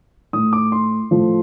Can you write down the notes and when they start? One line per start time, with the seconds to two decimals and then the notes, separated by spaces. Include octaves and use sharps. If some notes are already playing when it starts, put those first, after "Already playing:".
0.33 A2 A3 D#6
0.53 D6
0.72 C6
1.11 A2 F3 A3